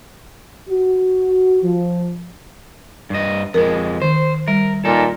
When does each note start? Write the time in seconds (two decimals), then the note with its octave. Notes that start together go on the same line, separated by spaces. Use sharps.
0.69 F#4
1.63 F3
3.10 G2 D#5
3.54 F2 G#3 A#4
4.02 D#3 C5
4.48 G3 A#4
4.85 A#2 D#4 A4